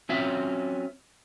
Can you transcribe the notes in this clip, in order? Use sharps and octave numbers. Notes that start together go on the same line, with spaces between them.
F#3 C4 C#4 F4 E5